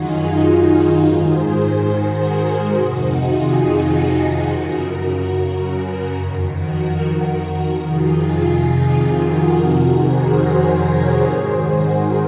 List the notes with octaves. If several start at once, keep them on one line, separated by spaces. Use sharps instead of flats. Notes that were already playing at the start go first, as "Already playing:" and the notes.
Already playing: F#2 D#3 D#4 F4 F#4 G#4
F#4 A#4
G#2 D#3 G#4 C5
G#4 C5
F#4 A#4
F2 C3 D#3 D#4 F#4
F4 G#4
F#2 C#3 F#4 A#4
F2 D#3
F#4 A#4
F2 C3 D#3 F4 G#4
F#4 A#4
F2 C3 D#3
G#4 C5
A#4 C#5
G#4 C5
G#2
D#3
F#4 A#4